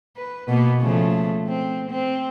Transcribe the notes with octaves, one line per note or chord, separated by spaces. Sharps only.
B4
B2 A#3 B3
C#3 F3 A3
C4
C4